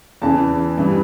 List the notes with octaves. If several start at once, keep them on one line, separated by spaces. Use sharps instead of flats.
E2 C#3 E3 A5
G2 E3 G3